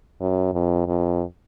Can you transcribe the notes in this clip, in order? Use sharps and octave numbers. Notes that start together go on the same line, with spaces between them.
F#2
F2
F2